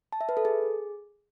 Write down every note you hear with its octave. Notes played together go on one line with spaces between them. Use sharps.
A5
E5
B4
A4
G#4